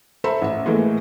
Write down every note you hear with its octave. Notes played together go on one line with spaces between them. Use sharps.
A4 C5 E5 A#5 B5
A1 E5
A2 E3 G#3 A#3